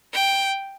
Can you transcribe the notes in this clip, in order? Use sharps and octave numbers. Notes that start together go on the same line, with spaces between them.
G5